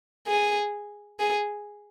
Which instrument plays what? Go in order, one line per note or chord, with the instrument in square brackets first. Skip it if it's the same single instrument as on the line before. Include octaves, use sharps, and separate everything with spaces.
[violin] G#4
G#4